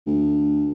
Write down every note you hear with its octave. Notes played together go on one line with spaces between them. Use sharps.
D2